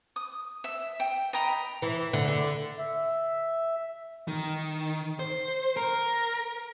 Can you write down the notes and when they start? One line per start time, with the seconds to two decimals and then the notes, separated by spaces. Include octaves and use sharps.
0.16 D#6
0.64 E5
1.00 G5
1.33 D#5 G5 A#5 B5
1.82 E3
2.13 D3
2.28 D3
2.79 E5
4.28 D#3
5.19 C5
5.77 A#4